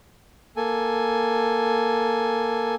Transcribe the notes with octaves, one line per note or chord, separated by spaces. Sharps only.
A#3 A4 G#5